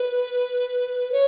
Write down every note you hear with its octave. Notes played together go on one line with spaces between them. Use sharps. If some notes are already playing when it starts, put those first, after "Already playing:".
Already playing: B4
C#5